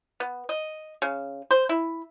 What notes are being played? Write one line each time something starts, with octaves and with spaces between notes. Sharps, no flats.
B3
D#5
C#3
C5
E4